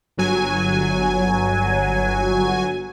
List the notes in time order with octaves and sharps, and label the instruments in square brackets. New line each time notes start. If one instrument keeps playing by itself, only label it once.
[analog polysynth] G1 F#3 G#5